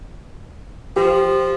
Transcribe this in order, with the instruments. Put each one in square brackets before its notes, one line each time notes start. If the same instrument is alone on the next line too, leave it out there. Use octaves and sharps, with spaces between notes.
[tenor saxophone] F3 [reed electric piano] G4